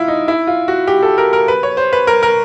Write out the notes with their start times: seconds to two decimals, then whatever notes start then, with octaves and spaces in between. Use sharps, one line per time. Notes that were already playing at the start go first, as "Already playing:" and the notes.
Already playing: E4 F4
0.08 D#4
0.28 E4
0.47 F4
0.68 F#4
0.87 G4
1.03 A4
1.18 A#4
1.33 A#4
1.48 B4
1.63 C#5
1.77 C5
1.93 B4
2.07 A#4
2.23 A#4